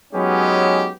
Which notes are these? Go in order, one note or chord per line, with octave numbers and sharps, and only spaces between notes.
F#3 G#3 B3 C#4 D#4 G4